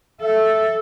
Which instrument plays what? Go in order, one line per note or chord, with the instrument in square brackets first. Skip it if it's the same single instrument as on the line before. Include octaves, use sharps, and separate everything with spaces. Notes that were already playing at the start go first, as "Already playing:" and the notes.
[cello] A4 [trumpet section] E5